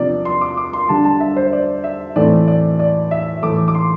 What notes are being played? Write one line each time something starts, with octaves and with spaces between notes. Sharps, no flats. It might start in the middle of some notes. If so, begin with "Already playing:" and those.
Already playing: C3 F3 A#3 D4 D5
C6
D6
D6
C6
D3 G3 D4 A5
A5
E5
C5
D5
E5
A2 E3 A3 C4 D5
D5
D5
E5
A2 E3 A3 D6
D6
C6